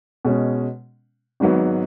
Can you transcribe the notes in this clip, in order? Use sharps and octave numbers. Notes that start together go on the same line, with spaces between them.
B2 G#3 C#4
G#1 G#2 F#3 B3